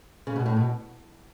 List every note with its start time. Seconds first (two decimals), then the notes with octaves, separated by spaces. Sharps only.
0.27 C#3
0.36 B2
0.46 A2
0.56 B2